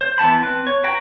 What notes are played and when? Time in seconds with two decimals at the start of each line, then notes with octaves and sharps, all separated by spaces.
0.01 C5
0.18 E3 B3 A5 B5
0.41 C4 B4
0.67 C#5
0.84 F#4 B4 G5 A#5